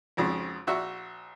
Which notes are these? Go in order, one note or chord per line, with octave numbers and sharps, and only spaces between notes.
G#1 F2 C#3
A#1 F#4 E5 C#6